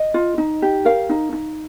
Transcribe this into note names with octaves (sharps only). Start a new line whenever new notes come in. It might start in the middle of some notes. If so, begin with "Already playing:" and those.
Already playing: D#5
F4
D#4
G4
A#4 F5
D#4
D#4